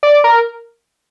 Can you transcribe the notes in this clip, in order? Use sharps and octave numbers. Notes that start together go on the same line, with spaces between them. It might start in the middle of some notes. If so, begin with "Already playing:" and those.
D5
A#4